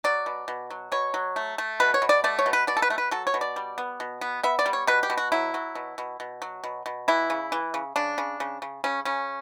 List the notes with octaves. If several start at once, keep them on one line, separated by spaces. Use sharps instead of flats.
F#3 D5
B2
B2
F#3
B2 C#5
F#3
A3
A3
B2 B4
C#5
B2
D5
A3 D5
C#5
B2
B4
B2 D5
A4
B4
A3
B4
F#3 A4
C#5
B2
D5
G3
B3
B2
B3
B3 E5
D5
G3
C#5
B2 B4
G4
B2
F#4
F#3 E4
F#3
B2
B2
B2
F#3
B2
B2
E3 E4
C#3
E3
C#3
C#3 D4
C#3
C#3
C#3
C#3 C#4
C#3 C#4